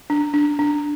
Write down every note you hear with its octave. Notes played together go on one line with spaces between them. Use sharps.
D4
D4
D4